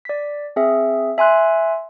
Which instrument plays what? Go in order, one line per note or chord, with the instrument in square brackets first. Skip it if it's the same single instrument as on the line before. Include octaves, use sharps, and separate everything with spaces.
[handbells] D5 B6
C4 G#4 E5
E5 G#5 C6 F#6